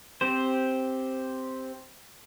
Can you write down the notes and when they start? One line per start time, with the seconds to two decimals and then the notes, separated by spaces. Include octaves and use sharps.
0.21 C4 G4 C5